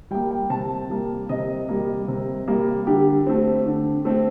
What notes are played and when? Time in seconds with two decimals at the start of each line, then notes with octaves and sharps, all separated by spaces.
0.11 G3 A#3 G5
0.31 G5
0.50 C3 A5
0.90 G3 A#3
1.29 C3 D#5
1.69 G3 A#3
2.08 C3
2.48 G3 A#3
2.87 D3 G4
3.27 A3 C4
3.66 D3
4.05 A3 C4